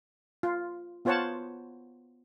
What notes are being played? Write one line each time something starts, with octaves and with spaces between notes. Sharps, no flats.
F4
B3 F4 C5 C#5 F#5 A5